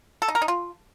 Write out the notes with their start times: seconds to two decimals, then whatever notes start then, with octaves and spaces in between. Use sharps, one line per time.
0.22 A4
0.28 D#4
0.35 A#4
0.42 D#4
0.48 F4